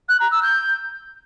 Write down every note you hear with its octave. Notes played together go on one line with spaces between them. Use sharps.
F#6
A#5
E6
G6